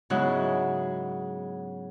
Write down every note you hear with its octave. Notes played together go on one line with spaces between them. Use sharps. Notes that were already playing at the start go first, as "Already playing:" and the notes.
G#2 C#3 F#3 B3 E4 F#6